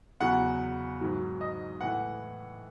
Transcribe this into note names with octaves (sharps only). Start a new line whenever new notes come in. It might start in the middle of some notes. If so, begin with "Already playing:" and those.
E2 C#3 F#3 F#5
G#2 D#3 F#3
D#5
A2 E3 F#5